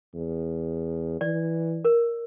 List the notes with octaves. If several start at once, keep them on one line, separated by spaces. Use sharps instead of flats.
E2
E3 D5
A#4